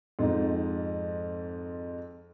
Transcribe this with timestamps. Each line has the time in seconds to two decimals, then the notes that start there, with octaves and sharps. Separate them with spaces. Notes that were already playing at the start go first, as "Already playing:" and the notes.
0.19 F2 G#2 D#4